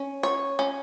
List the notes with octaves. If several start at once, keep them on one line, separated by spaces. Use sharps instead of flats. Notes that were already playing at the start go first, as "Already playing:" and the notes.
Already playing: C#4
C#5
C#4